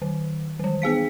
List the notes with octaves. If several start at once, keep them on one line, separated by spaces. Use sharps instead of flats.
D#3
D#3 E3
B3 G#4 F5 B6